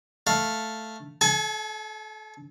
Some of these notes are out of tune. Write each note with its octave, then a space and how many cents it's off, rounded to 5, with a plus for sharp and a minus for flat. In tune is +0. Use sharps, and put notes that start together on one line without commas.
A3 +0 F5 +0
A4 -30 G#5 +30